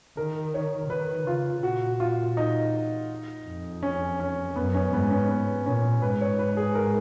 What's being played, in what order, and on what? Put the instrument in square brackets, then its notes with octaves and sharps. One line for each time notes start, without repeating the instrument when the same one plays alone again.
[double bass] D#3 [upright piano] A#4
[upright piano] C#5
[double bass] D#3 [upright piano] B4
[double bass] C#3 [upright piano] F4
[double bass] A#2 [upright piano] F#4
[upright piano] F4
D#4
[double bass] F2
[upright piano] C#4
C#4
[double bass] F#2 [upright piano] B3
[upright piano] C#4
[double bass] G#2 [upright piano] B3
[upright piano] C#4
B3
[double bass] A#2 [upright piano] C#4
[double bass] G#2 [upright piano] B4
[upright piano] C#5
B4
G#4
A#4